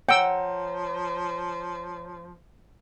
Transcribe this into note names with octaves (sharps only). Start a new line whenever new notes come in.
F3 C#5 F#5 G5 A#5 E6